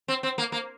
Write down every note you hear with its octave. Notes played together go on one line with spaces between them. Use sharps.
C4
C4
A#3
A#3